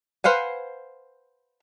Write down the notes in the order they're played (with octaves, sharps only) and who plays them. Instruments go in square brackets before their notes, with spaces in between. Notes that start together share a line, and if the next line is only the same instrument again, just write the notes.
[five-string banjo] B4 C5 F5 F#5 G#5